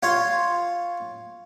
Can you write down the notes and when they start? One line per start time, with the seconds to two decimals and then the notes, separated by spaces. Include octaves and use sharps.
0.03 F4 C#5 C6